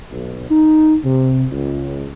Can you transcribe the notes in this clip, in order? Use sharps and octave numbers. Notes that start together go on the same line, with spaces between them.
B1
D#4
C3
C#2